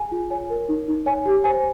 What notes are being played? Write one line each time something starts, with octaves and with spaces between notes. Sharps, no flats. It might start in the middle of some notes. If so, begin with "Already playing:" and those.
Already playing: G#4 G#5
F4
C#5 G#5
A#4
D#4
D#4
C#5 G#5
G4
C5 G#5